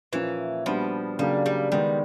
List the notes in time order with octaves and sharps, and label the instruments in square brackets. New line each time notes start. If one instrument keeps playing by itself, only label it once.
[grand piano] A#2 F3 A#3 C#4 [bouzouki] E3
[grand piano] A#2 G3 B3 D4 F#4 [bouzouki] F3
[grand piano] C#3 F#3 A#3 D4 G4 [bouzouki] G3
[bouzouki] G3
[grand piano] D#3 G#3 B3 D#4 [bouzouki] G3